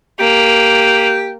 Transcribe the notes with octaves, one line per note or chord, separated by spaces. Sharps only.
A#3 G4